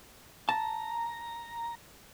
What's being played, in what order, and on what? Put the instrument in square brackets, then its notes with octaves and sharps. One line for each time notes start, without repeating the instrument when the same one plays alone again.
[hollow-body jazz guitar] A5 [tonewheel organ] A#5